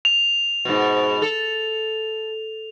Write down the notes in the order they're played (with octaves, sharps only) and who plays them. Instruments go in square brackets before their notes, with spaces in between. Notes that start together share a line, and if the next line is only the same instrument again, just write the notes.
[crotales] F7
[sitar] G#2 B2
A4